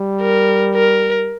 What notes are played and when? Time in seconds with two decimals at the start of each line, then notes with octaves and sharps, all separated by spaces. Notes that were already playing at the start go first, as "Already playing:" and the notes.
Already playing: G3
0.22 A#4
0.75 A#4